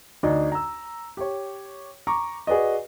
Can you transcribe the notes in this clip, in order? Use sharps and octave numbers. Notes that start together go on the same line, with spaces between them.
D2 D4 D#4 D#5
A#5 E6
G4 C#5
A#5 C#6 D6
F#4 G#4 B4 D5 D#5